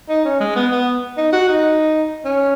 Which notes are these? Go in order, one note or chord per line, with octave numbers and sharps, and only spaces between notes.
D#4
C#4
G#3
B3
B3
D#4
F#4
D#4
C#4